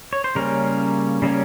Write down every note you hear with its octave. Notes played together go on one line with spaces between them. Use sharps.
C#5
C5
C#3 G3 A#3 C#4 A#4
C#3 G3 A#3 C#4